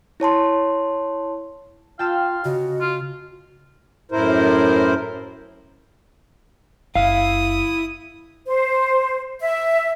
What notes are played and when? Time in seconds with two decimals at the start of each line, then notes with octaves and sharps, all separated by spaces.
0.20 E4 C#5 A5 C6
1.99 F4 F5 G5 A5 E6
2.45 C#3 F#4 D#5
2.81 F4
4.12 F#2 A2 E4 A#4 C5
6.95 F#1 E4 F5 D#6
8.47 C5
9.40 E5